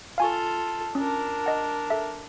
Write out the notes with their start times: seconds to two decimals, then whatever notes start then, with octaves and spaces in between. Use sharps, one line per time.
0.18 F4 A4 F5 G#5 C#6
0.95 C#4 D4 A#4
1.46 D#5 F#5
1.90 A4 E5